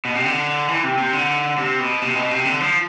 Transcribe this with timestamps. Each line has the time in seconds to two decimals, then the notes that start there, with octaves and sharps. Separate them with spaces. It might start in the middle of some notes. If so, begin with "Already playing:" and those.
0.05 B2
0.15 C3
0.25 D3
0.69 E3
0.84 C3
0.98 C3
1.13 D3
1.58 C3
1.79 B2
2.02 C3
2.16 B2
2.31 C3
2.45 D3
2.60 F3